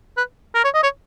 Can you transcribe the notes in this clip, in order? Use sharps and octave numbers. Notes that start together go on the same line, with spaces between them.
B4
A#4
C#5
D#5
C#5